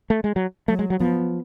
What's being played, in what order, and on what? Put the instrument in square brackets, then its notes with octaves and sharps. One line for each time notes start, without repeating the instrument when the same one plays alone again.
[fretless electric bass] A3
G#3
F#3
[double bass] F#3 [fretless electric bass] A3
[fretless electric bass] G#3
F#3
[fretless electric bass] F3 [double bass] B3